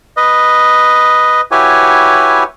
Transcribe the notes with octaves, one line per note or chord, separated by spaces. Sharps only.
B4 D#5
E4 F#4 G4 B4 C#5 G#5